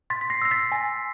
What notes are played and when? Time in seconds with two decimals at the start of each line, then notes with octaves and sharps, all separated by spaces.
0.10 C6 A6 B6
0.21 B6
0.30 A#6 C7
0.42 E6 A#6
0.51 A6 B6
0.72 G#5